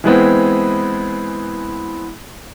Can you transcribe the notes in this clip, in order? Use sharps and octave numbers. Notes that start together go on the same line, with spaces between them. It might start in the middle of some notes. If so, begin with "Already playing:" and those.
E3 G#3 B3 C4